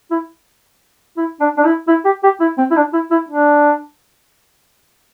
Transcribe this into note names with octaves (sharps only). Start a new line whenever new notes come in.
E4
E4
D4
D4
E4
E4
G4
G4
E4
C4
E4
D4
E4
E4
D4